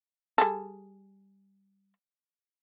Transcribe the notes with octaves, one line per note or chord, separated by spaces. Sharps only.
G3 G#4 A4